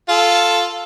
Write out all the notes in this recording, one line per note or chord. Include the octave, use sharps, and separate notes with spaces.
F4 A4